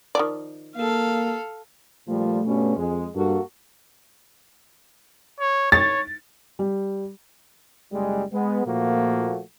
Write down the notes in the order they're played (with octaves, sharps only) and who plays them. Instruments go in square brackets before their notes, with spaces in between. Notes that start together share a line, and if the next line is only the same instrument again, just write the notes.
[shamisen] D#3 F3 D5
[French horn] A#3 [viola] A4 F5
[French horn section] A#2 F3 G3 [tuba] A3
[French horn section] G2 B2 C#4
[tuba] F2 [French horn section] G#3
[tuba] G2 [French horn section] A#3 F#4 A4
[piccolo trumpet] C#5
[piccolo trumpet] C#5 [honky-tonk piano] A6
[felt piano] G3
[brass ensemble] F#1 G3 G#3
G#3 B3
A#2 F3 A3 A#3 F#4